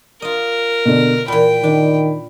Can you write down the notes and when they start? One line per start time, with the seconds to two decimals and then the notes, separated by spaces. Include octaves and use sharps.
0.22 F4 A#4 D#5
0.85 B2 D3
1.28 A#2 E3 G5 B5
1.64 D#3 D4